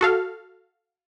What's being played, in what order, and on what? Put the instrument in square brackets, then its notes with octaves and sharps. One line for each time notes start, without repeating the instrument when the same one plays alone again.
[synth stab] F#4 A4 F5